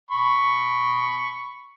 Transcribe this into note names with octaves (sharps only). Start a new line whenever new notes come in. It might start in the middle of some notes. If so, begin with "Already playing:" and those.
B5 C#6